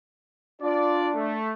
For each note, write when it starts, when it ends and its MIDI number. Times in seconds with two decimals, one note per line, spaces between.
0.62 1.38 62
0.62 1.09 65
0.62 1.09 74
1.15 1.53 57